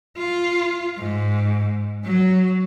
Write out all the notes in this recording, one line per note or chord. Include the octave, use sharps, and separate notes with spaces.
F4
G#2
F#3